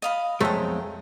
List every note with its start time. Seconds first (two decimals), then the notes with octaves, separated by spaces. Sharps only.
0.02 D#5 F5 B5
0.40 B1 F2 G#3 A3 G5 A#5